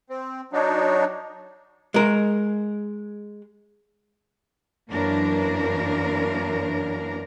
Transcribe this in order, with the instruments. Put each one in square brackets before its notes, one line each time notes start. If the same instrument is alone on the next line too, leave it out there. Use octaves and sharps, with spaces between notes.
[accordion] C4
F#3 D4 D#4
[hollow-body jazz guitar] G#3 A#4
[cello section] F#2 E3 A#3 D4 A#4